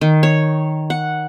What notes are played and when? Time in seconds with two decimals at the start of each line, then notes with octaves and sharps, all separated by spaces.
0.01 D#3
0.23 C#5
0.90 F#5